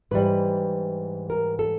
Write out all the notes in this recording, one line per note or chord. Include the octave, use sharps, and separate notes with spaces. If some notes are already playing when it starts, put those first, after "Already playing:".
G#2 E3 G3 B4
A#4
A4